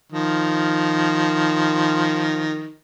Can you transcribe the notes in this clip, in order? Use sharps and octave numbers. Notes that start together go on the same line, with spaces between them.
D#3 F3